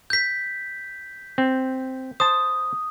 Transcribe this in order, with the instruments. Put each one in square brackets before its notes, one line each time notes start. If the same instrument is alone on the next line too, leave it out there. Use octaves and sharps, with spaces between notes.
[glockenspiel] G6 B6
[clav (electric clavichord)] C4
[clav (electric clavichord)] C5 A5 [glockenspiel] D#6